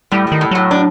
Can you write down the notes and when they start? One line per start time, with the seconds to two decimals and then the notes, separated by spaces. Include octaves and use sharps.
0.11 A2 G3
0.27 D#3 G3
0.41 A2
0.51 A2 F#3
0.71 D4